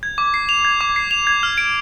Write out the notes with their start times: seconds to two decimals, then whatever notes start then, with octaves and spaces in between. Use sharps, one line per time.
0.03 G#6
0.18 D6
0.34 C7
0.49 F7
0.65 G#6
0.81 D6
0.96 C7
1.11 F7
1.27 G#6
1.43 F6
1.58 D7